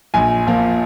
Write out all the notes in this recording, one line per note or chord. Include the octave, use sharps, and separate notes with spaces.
A#1 G#5
A#2 F3 A#3